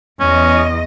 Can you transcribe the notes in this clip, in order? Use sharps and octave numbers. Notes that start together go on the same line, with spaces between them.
E2 C#4 D#5